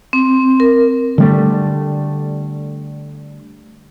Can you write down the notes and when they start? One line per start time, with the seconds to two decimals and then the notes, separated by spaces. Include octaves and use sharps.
0.13 C4
0.60 A#4
1.18 D3 G3 A3